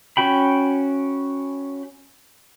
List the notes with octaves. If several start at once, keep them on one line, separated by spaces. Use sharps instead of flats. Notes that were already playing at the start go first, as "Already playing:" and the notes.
C#4 F#4 G5 B5